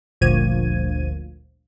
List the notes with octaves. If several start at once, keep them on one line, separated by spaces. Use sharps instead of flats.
G1 D2 A#2 F3 G#6 D#7